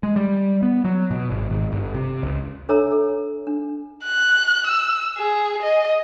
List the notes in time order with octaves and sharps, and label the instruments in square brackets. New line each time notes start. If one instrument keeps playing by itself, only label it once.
[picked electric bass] G#3
G3
B3
F#3
B2
G#1
G#1
G1
C3
C#2
[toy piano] D4 A4 C#5 E5 A#5 E6
A4
D4
[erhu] F#6
E6
G#4
D#5